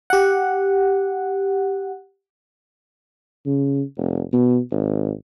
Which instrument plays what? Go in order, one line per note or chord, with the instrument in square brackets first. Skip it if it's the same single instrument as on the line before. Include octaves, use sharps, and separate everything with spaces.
[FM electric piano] G4 F#5
[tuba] C#3
F1
B2
G#1